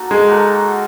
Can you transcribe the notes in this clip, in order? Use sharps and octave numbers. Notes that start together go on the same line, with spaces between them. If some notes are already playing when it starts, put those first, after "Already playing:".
Already playing: A#3 D#4 F#4 A4
G#3
A#3 D#4 F#4 A4